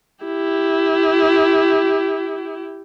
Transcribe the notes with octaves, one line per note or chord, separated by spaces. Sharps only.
E4 G4